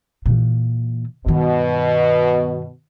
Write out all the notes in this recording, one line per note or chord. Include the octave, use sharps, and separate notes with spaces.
A#2 E3
G2 B2 D#3